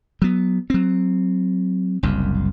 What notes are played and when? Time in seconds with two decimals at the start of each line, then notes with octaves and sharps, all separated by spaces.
0.22 F#3 B3
0.70 F#3 C4
2.03 F#1 C2 F#2